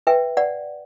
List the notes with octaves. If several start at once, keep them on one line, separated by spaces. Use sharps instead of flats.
B4 E5 G5
D5 F#5